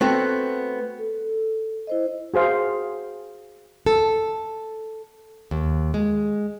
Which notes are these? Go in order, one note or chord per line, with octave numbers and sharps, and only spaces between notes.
A3 B3 C4 F#4
A4
E4 C5 D#5
F#4 G#4 C5 F5
A4
D#2
G#3